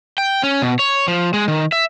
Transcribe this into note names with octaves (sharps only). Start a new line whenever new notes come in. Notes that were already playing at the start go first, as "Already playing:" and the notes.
G5
C#4
B2
C#5
F3
G#3
D#3
E5